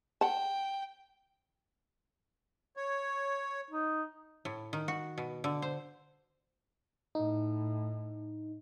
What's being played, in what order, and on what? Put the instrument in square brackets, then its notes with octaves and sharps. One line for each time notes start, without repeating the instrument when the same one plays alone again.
[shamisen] F#5 A5 [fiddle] G5
[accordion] C#5
[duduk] D#4
[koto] A2
D#3
F#4
B2
D3
C5
[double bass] A2 [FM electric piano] D#4